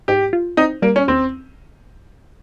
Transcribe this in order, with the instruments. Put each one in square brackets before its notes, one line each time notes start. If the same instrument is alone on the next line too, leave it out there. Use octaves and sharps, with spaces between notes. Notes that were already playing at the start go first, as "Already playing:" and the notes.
[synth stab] G#2 [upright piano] G4
[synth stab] F4
[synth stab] C4 [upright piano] D#4
[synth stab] G3 [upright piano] A#3
[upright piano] C#4
[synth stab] D#2 [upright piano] C4